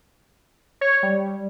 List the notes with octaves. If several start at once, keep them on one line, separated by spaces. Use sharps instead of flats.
C#5
G3